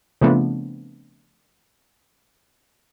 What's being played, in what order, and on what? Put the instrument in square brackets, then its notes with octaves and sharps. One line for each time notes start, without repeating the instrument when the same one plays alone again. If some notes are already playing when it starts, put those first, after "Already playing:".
[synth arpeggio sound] C#3 F3 A3 B3 C4 D4